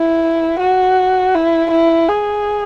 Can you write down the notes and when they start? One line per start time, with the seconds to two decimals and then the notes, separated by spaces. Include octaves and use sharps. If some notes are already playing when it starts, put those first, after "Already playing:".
Already playing: E4
0.60 F#4
1.35 E4
1.71 E4
2.08 G#4